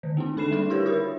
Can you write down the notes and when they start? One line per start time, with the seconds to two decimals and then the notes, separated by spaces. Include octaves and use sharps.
0.03 D3 D#3
0.17 A3 A#3 C4 D#4
0.36 D3 D4 A4 B5 C7 E7
0.51 G3 D4 D#4 G#4
0.70 D#4 E4 G4 A#4 B4 C#5
0.86 F#4 G4 A#4 B5